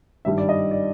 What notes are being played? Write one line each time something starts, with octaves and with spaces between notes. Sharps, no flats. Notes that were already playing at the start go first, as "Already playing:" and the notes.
G#1 G2 D#3 G3 E5
D5
D#5
D5